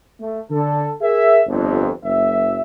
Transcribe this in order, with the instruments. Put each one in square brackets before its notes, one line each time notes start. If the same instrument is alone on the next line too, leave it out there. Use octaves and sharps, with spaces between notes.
[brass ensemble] A3
D3 A4
G#4 A#4 E5
G1 F2
F#1 E5